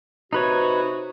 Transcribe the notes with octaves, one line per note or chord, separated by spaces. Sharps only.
C3 D#4 F#4 B4 C#5